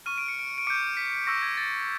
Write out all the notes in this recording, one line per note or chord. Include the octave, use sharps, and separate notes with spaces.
C#6 F6 D#7
D7
C#7
D7
D7
D6 G6 C#7
B6
C#6 E6 G6 A#6
G#6
A6